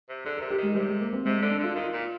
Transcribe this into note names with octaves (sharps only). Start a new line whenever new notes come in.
C3
D3 G#4
C3 A#4
G4
D#3 G#3
C3 G3
G#3
A#3
C4
C3 G#3
D3 G#3
D4
D3 F4
D#3 F4
A#2